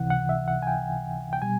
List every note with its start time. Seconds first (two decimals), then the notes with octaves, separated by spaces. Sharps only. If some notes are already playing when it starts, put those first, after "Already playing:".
Already playing: C#2 C3 E3 F#5
0.10 F#5
0.29 E5
0.48 F#5
0.62 G#5
0.67 G5
1.33 G5
1.42 B2 G3 G#5